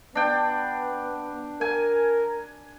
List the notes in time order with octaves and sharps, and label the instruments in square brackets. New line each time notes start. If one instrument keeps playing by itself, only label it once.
[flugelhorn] B3 [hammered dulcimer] D4 G5
[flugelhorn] A#4 [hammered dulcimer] G#5